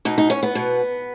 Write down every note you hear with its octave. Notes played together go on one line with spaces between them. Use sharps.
B2 D#4
D#4
C#4
B3
B2